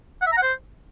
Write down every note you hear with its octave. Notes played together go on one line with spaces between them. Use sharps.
F#5
E5
A#5
F#5
C5